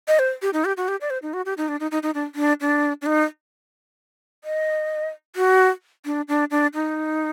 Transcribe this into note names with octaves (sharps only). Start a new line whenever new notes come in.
D#5
C5
G4
D#4
G4
F#4
G4
D5
C5
D#4
F#4
G4
D#4
D4
D#4
D#4
D#4
D4
D4
D4
D4
D#4
D#5
F#4
D4
D4
D4
D#4